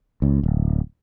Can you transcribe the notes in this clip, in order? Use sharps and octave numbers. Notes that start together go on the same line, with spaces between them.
C#2
D1